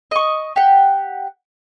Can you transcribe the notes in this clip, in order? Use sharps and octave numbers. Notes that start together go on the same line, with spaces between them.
D#5 C#6
G4 F#5